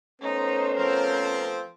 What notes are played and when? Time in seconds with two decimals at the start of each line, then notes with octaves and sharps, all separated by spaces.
0.21 A3 B3 C#4 D#4 C5
0.77 F3 C4 A#4